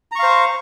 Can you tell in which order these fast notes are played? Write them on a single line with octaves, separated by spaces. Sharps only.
A#5 C#6 F5 C5